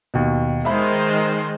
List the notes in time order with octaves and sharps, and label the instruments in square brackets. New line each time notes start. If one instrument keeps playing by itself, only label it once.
[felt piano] D#2 B2
[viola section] D#3 G#3 C5 [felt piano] E5 B5